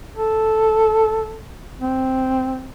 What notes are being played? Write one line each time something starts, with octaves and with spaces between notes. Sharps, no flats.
A4
C4